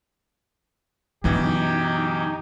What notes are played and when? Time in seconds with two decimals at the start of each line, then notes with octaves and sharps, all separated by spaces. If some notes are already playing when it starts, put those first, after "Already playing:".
1.24 F#2 B2 D3 E3 F#3 D#4 G4